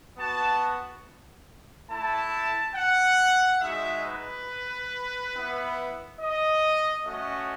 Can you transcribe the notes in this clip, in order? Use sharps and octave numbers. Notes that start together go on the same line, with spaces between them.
B3 F#4 A5
A3 E4 A5
F#5
G#3 D#4 F#4 E5
B4
B3 E4
D#5
A3 C#4 F#4 D#5